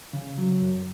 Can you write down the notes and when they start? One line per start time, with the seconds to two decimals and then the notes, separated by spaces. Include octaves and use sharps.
0.13 C#3
0.38 F#3
0.62 F#2